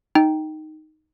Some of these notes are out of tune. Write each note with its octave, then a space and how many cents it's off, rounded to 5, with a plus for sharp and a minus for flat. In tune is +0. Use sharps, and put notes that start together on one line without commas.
D#4 +0 G5 -5